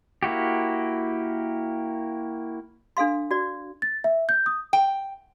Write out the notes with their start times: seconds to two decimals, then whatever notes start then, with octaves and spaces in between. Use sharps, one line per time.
0.23 A#3 E4 F#4 G4
2.97 D4 A4 F5 C6
3.31 F#4 D5
3.82 A6
4.04 E5
4.29 G6
4.46 D#6
4.73 G5